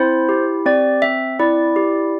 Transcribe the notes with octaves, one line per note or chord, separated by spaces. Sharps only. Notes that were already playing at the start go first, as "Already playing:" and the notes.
Already playing: C4 E4 C5
G4
C4 D5
C4 E5
E4 D5
G4